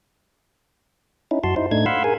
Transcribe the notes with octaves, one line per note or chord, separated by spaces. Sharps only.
C#4 D#4 E4
F#2 F#4 A5 C6
D#4 E4 C5
A2 A3 D4 D#4 G#6
F5 F#5 B5 C6 E6
G#4 A#4 G#5